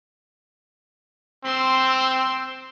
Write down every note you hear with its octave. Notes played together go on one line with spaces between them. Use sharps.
C4 C6 E6